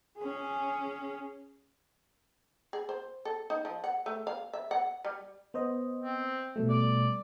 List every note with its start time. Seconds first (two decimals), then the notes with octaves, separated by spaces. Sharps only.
0.18 C#4 G#4
2.73 G#4
2.89 C5
3.25 A4
3.50 D#4
3.65 F3
3.84 F#5
4.06 A3
4.27 F5
4.53 E5
4.71 F#5
5.05 G3
5.54 B3 C5 D#5
6.03 C4
6.56 B2 G3 A3
6.70 D5